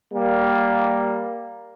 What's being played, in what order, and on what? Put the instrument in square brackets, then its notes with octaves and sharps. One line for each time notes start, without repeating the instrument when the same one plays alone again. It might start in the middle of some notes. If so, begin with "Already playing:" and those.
[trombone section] G3 A#3